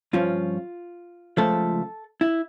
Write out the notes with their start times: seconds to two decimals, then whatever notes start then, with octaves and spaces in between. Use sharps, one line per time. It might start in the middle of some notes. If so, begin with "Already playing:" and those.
0.13 G2 F3 C#4 F4
1.37 C#2 C#3 F3 A3 A4
2.21 E4